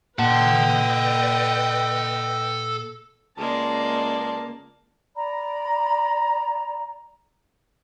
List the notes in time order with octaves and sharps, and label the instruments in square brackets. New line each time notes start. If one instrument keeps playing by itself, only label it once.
[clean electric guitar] A#2 A5 [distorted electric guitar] A4 F#5 [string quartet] B4 D#5 G5
[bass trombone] C#2 [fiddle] G#3 D5 [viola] A#3 [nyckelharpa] A5
[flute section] D5 A#5 B5